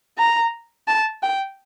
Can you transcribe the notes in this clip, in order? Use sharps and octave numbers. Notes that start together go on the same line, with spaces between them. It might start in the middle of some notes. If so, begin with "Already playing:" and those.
A#5
A5
G5